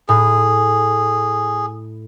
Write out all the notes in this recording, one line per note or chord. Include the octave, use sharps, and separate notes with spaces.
A2 G#4